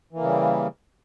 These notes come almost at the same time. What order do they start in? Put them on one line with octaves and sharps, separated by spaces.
E3 A#3 C#3 G3